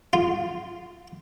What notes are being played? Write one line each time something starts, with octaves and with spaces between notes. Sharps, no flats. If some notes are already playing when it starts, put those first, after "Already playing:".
F4